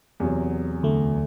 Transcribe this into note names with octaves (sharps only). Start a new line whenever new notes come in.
E2 C3 F#3
D2 A3